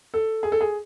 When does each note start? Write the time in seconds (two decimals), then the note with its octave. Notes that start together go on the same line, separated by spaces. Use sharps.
0.14 A4
0.43 G#4
0.52 A4
0.61 G#4